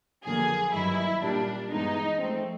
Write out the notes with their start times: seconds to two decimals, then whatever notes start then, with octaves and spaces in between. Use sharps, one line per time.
0.24 F2 D3 F#3 A#3 G#4
0.73 G2 D#3 F#3 E4
1.22 A#2 G3 A#3 D4
1.71 G2 E3 G#3 B3 D#4
2.20 G#2 F3 A3 C4